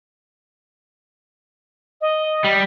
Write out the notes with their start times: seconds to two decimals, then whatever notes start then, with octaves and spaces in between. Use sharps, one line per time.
2.01 D#5
2.44 G3